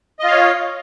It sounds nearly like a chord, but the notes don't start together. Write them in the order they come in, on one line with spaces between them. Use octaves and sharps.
D#5 F4 F5 C#5